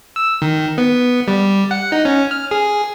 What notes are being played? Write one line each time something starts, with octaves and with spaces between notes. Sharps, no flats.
E6
D#3
B3
G3
F#5
D#4
C#4
F6
G#4